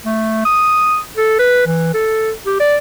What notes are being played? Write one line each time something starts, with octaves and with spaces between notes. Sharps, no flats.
A3
D#6
A4
B4
E3
A4
G4
D5